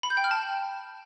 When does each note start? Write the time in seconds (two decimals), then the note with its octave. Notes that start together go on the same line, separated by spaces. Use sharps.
0.03 B5
0.10 G6
0.17 G5
0.24 F6
0.31 A5